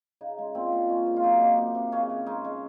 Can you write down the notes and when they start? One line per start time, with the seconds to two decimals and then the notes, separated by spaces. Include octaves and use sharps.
0.21 C#3 D#4
0.39 G#3
0.55 A#2 C4
0.72 A#2
0.89 G#3 C#4
1.06 C3
1.16 F4
1.23 F#3 D#4
1.41 A#3
1.57 C3
1.75 C3
1.92 C#3 C#4
2.10 C#3
2.26 G#3 D#4
2.44 G#3